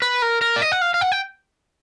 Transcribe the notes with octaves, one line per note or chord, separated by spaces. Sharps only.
B4
A#4
A#4
D5
D#5
F#5
F5
F5
F#5
G5